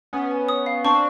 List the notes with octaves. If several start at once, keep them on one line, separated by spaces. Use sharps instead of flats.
B3 C#4 D#6
G#5
D#6
F5
C4 D4 C#6